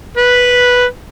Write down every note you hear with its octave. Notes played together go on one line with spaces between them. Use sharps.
B4